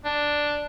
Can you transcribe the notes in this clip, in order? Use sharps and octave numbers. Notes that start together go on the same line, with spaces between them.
D4